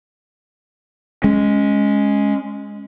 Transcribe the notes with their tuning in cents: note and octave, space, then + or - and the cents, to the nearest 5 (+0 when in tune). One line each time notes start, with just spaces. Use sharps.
G#3 +0 C#4 +0